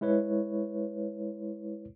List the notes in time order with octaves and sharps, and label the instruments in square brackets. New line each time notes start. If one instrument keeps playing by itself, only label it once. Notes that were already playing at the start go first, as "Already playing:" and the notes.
[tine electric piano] G#3 E4 B4 C#5